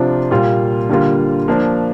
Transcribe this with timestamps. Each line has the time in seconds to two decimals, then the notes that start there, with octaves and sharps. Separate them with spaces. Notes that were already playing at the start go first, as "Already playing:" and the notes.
Already playing: C3 F3 D4 F4
0.31 A#2 G3 A#3 F4
0.89 D3 G3 A#3 F4
1.48 F3 A#3 D4